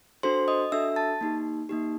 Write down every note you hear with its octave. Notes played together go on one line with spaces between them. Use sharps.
D4 F#4 A4 C5 C6
D#5 D#6
D4 F#4 A4 E5 E6
A5 A6
A#3 D#4 G4
A#3 D#4 G4